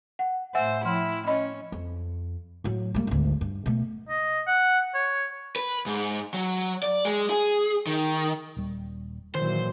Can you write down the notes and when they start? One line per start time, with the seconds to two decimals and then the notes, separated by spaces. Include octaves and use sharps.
0.19 F#5
0.55 A2 C5 E5 F#5 G#5 E6
0.85 F3 E4 G5 C6 F6
1.27 C#4 D#5 B5
1.72 F2
2.64 A2 F#3
2.94 G3 A#3
3.07 G#1 D2
3.41 G2
3.66 B2 A3
4.09 D#5
4.47 F#5
4.94 C#5
5.56 B4
5.86 G#2
6.34 F#3
6.83 D5
7.05 G#3
7.30 G#4
7.87 D#3
8.57 D#1 G3
9.35 A#2 D#3 E3 F#3 C5